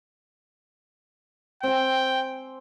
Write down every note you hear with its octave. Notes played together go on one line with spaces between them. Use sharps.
C4 G5 G#5